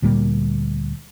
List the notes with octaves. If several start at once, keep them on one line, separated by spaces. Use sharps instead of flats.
D2 A#2 G3 A#3